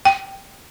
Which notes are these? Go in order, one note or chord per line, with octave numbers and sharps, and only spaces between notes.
G5